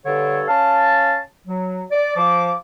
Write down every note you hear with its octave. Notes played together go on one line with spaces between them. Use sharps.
G2 D3 A4 C#5
C#4 F5 A5
F#3
D5
F3 D6